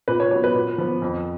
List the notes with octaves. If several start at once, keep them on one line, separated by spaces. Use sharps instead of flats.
A#2 B4
C#5
F#3 B3 C#5
B4
A#2
F3 B3
F2